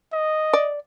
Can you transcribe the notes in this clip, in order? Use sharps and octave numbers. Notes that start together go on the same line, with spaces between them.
D#5
D5